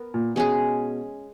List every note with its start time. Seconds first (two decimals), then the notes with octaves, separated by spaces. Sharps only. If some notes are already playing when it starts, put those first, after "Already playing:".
Already playing: B3 A#4
0.14 A#2
0.35 B2 G#3 C#4 G#4